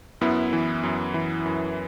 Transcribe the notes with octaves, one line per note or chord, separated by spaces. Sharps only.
F#2 B3 E4
E3
F#2
E3
F#2